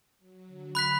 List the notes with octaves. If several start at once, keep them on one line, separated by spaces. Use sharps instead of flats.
F#3
D3
B5 F#6 B6